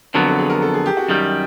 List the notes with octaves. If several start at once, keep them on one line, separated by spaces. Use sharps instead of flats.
F2 D3 F#3 B3 A#4
A4
G#4
A#4
A4
G#4
G4
F#4
F#2 D#3 G3 G4